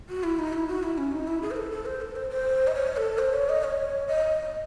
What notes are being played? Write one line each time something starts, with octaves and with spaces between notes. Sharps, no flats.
F#4
E4
D#4
E4
F#4
E4
C#4
D#4
E4
G#4
C5
A4
A4
C5
A4
C5
C5
D#5
C#5
A4
C5
C#5
D#5
C#5
D#5